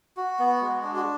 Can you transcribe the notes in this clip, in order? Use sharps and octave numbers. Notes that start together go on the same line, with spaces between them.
F#4
B3
G#3
D4
F#4